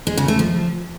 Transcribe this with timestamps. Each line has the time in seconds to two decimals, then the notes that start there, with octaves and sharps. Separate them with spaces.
0.07 G#3
0.18 C#3
0.28 A3
0.39 F3